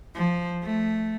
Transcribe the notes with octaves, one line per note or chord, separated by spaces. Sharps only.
F3
A3